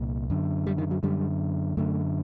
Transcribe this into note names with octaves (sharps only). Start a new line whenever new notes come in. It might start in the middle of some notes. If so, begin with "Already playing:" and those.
Already playing: C2 A#2
F#2 D3
G3
D#3
F#3
F#2 D3 G3
F#2 D3 A3